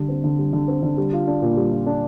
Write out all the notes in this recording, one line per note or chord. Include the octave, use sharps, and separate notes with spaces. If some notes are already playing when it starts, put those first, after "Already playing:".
Already playing: D3 G3
C4
D3
G3
D3
C4
D3
G3
F4
D4
A#2
G3
F4
D4